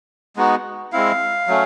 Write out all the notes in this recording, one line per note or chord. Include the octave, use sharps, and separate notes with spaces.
G#3 B3 D#4 F#4
G#3 C4 E4 F5
F#3 A3 C#4